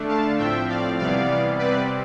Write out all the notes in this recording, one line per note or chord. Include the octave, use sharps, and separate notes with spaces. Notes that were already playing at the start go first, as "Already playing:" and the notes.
Already playing: D3 A3 D4
F5 A5
A2 F3 C4 E5 G5
D5 F5
C3 E3 G3 B3 D5 F5
C3 G3 C4 B4 D5